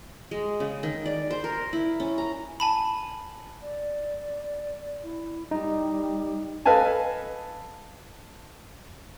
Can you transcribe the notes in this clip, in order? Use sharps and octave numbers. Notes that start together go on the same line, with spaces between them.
G#3
C#3
D#3
D5
C5
A#4
E4
C#4
A#5
G#5 A5 B5
D5
E4
G3 D#4
A4 B4 D#5 F5 G#5 A5